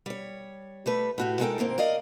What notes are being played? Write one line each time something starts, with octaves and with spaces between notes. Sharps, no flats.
G3 C#5
G3 A3 B4
A2 F#4 G4
G#3 D#4 F#4 A4 A#4 G5
G#2 D#3 A#3 C4
A#4 D5 D#5 F5